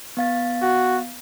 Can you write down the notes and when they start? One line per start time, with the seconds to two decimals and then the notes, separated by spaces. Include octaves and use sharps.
0.17 B3 F5 A6
0.62 F#4